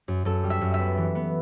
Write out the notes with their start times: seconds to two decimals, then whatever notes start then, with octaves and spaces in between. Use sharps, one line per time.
0.08 F#2
0.25 F#2 A4
0.43 G3
0.50 E5
0.61 F#2
0.74 E5
0.79 B3
0.97 E3
1.15 B3